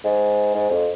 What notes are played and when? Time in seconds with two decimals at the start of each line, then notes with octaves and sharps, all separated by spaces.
0.04 G#2
0.54 G#2
0.70 F2